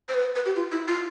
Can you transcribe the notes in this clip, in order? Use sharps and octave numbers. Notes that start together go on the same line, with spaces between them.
C5
B4
B4
G4
F4
E4
F4